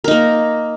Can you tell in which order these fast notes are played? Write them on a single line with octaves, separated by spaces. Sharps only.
A#4 D#4 A#3